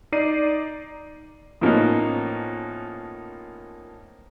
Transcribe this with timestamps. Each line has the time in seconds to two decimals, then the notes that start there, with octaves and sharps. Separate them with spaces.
0.12 D#4 D5 C7 D#7
1.61 A2 F3 A#3 B3 C#4 D#4